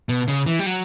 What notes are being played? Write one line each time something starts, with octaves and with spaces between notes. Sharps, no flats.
B2
C#3
E3
G3
F#3